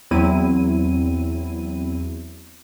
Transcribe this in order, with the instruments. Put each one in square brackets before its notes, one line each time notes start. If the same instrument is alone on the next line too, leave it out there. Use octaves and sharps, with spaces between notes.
[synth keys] E2 F#3 C4 E4 D#7